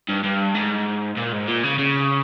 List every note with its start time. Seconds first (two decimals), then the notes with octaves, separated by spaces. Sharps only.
0.09 G2
0.24 G2
0.55 G#2
1.17 A#2
1.32 G#2
1.48 A#2
1.64 C#3
1.79 C#3